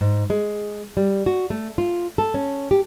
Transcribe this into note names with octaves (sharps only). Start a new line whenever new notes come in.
G#2
G#3
G3
F#4
A3
F4
A4
C#4
G4